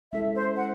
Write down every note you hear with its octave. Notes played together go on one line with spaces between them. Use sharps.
G#3 C#4 E4 A4 E5
C5
F#5